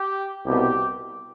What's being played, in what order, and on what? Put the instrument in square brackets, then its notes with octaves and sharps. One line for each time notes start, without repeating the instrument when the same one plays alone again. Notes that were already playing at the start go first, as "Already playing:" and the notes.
Already playing: [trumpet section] G4
[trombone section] C2 B2 [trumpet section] G4